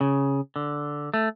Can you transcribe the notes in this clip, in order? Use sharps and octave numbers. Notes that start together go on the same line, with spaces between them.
C#3
D3
A3